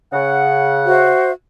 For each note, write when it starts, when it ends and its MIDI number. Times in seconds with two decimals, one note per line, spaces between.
0.13 1.09 49
0.13 1.09 78
0.87 1.32 66
0.87 1.32 72
0.87 1.32 76